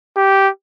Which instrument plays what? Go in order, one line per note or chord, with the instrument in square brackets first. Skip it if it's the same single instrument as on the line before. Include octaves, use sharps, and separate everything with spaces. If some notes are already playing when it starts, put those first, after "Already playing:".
[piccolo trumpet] G4